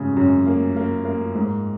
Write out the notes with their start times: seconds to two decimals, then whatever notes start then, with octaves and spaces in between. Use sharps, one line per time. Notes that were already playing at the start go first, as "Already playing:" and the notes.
Already playing: G#1 F#2 C#3
0.16 F#2
0.46 A#3
0.76 A#3
1.05 A#3
1.35 G#2